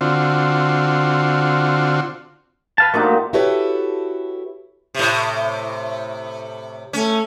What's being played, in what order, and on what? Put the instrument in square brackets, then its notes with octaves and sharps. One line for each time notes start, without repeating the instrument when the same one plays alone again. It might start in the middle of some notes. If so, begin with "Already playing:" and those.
[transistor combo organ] D3 C4 F4 F#4
[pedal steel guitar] B4 F5 A5
[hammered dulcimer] A#2 D4 D#4 [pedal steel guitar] A3 F#4 G4
[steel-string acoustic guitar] E4 F#4 G4 A4 B4 C#5
[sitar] A2 C3
[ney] A3 [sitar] C#4